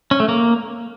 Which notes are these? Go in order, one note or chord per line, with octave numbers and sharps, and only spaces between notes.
C#4
A3
A#3